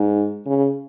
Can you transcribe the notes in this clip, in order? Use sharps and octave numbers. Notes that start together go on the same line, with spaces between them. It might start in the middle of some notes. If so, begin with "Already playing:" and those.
Already playing: G#2
C#3